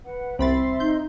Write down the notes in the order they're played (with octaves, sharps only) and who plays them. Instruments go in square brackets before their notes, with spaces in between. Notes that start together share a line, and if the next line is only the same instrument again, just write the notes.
[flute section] B4 F#5
[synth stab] C2 B5 A6 [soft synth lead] C4 [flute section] E5 C6
[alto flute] D#4 [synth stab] G6